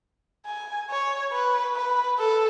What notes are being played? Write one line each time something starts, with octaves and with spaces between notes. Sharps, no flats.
G#5
C#5
B4
B4
A4